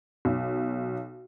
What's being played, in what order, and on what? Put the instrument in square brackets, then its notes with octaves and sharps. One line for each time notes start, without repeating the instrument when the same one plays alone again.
[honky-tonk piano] B1